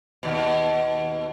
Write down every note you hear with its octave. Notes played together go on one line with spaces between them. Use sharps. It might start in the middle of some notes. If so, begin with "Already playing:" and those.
D#2 B2